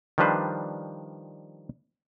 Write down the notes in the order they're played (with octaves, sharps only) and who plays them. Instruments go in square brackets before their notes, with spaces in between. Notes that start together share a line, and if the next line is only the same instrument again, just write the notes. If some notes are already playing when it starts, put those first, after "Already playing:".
[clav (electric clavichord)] D#3 F3 G3 D4 B4 C5